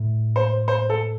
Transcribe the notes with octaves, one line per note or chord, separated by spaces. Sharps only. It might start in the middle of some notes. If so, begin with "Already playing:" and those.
Already playing: A2
C5
C5
A4